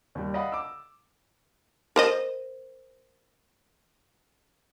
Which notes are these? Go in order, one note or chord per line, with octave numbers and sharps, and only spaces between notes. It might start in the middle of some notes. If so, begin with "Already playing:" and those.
D#2 G3
D5 D#5 F5 F#5 B5
D6 E6
A#4 C5 D#5